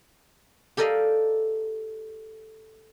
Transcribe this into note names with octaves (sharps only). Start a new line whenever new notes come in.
G4 A4 A#4 D5 D#5 F5